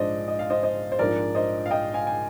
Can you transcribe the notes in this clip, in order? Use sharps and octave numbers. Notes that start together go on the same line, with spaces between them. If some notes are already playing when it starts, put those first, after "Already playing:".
Already playing: A#1 G#2 F3 G#3 D4 C5 D5 D#5
D#5
F5
C5 D#5
C5 D#5
C5
A#1 G#2 F3 A#4 D5
C5 D#5
F5
D#5 G5
F5 G#5
G#5